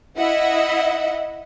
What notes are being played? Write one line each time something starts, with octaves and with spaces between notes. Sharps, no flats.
E4 D#5 E5 F#5